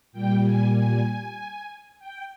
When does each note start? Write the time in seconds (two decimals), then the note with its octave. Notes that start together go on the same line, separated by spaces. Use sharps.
0.13 A#2 G3 G5
0.45 G#5
0.76 G#5
1.99 G5